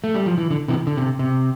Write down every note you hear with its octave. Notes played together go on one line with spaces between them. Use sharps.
A3
G3
F3
E3
D3
C3 E3
D3
C3
C3